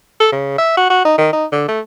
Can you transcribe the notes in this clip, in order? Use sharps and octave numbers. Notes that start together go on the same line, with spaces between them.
A4
C#3
E5
F#4
F#4
D#4
D#3
D#4
D3
A3